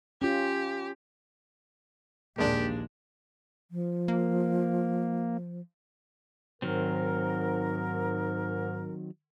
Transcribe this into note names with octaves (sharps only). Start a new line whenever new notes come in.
C#4 F4 G4
A#1 D#2 G#3 A#3 D4 G4
F3
A#3
G#2 D#3 F#3 C4 A#4